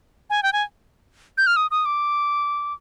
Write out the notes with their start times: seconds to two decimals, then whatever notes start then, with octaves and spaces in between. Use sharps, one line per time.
0.30 G#5
0.43 G5
0.53 G#5
1.38 G6
1.47 F6
1.56 D#6
1.71 D#6
1.85 D6